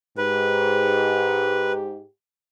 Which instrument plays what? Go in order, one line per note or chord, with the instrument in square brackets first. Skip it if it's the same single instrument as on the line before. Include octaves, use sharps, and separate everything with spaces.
[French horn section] G#2 [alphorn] G4 [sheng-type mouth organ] B4